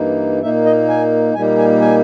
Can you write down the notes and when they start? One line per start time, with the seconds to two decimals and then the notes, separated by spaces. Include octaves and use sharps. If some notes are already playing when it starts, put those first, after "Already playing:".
Already playing: G2 E3 A#3 D#4
0.42 A#2 A#3 D#4 E5
0.65 D#5
0.89 G#5
1.35 A#2 G3 A#3 D#4 G#5
1.58 G#5
1.81 G#5